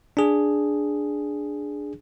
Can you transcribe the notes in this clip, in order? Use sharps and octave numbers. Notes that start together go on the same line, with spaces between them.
D4 G#4